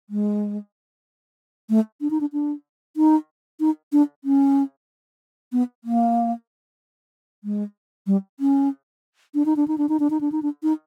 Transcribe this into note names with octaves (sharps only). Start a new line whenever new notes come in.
G#3
A3
D4
D#4
D4
D4
D#4
D#4
D4
C#4
B3
A#3
G#3
G3
C#4
D4
D#4
D4
D#4
D4
D#4
D4
D#4
D4
D#4
D4
D#4